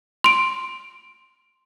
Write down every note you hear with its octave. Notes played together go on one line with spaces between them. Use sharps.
C6 D7